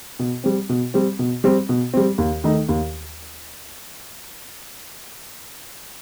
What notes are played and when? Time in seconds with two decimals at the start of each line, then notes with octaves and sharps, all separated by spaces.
0.19 B2
0.44 G3 C4
0.69 B2
0.94 G3 C4
1.19 B2
1.44 G3 C4
1.69 B2
1.94 G3 C4
2.18 D#2
2.44 D#3 A3 D#4
2.69 D#2